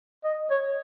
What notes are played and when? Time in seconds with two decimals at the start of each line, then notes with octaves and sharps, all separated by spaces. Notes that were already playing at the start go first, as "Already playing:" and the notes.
0.24 D#5
0.50 C#5